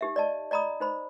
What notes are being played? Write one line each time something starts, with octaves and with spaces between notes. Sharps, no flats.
D#4 G4 E5
D5 D#5 A5
D5 D#5 A#5 B5 D#6
D#4 C5 B5